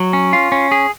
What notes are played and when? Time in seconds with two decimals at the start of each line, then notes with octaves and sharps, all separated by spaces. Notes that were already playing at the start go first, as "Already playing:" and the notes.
Already playing: F#3
0.13 C#4
0.33 F4
0.52 C#4
0.72 G#4